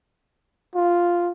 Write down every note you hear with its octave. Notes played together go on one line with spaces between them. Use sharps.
F4